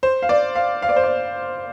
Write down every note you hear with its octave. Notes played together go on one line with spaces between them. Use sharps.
C5
F5
D5
F5
F5
D5
C5
D5